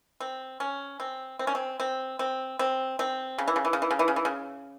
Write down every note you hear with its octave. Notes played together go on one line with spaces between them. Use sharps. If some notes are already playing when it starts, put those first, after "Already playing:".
C4
C#4
C4
C4
C#4
C4
C4
C4
C4
C4
C#3
E3
C#3
E3
C#3
E3
C#3
E3
C#3
E3
C#3